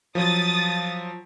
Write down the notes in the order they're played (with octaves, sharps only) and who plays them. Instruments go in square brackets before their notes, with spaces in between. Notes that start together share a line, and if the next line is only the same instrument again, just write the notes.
[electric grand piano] F3 F#3 [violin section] D#6 A6